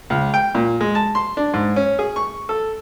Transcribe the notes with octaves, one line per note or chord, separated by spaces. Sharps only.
C#2
G5
A#2
G#3
A5
C6
D4
G#2
C#4
G#4
C#6
A4